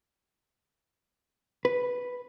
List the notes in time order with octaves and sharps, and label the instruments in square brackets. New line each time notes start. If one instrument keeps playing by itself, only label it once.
[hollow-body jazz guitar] B4